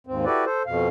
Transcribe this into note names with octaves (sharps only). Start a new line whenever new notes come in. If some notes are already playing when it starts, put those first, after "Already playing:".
D#2 G#2 C4
E4 F#4 G4 A4 B4 D5
A4 C5
F2 B2 F5